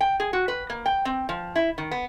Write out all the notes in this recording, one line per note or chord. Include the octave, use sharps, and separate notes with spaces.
G5
G#4
F#4
B4
A#3
G5
C4
F3
E4
D#3
B3